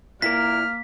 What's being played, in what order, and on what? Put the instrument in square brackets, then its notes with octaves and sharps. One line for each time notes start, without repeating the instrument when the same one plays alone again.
[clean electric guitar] A#2 E4 A#4 [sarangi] A#3 [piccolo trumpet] F6 [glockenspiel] B6